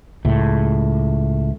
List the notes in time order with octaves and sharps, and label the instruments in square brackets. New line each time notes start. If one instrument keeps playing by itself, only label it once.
[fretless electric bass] C#2 A2